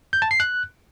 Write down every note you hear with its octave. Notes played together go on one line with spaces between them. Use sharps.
G6
A5
C7
F#6